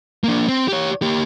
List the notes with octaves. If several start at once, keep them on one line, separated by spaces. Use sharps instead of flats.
A#3 D4
C4
G4 C#5
A#3 G4